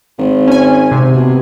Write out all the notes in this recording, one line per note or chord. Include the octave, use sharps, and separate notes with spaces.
G#1
C#4 G#5
C3
B2